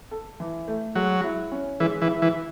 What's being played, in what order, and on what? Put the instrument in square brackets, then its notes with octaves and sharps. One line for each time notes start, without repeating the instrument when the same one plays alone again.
[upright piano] A4
E3
A3
[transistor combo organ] F#3 [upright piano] G#3
[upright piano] E4
C#4
[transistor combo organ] E3 [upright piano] G#3
[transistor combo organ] E3
[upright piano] E4
[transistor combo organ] E3